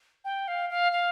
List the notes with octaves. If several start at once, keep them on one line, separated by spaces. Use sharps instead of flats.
G5
F5
F5
F5